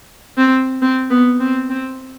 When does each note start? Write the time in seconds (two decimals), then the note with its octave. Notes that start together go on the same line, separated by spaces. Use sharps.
0.38 C4
0.82 C4
1.11 B3
1.40 C4
1.70 C4